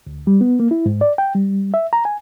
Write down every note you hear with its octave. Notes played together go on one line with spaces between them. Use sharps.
D2
G3
B3
A#3
E4
G#2
D5
G5
G3
E5
A#5
G#5